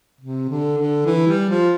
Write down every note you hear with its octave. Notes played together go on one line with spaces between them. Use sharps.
C3
D3
D3
E3
G3
F3